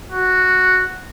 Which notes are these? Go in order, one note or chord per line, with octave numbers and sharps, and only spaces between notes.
F#4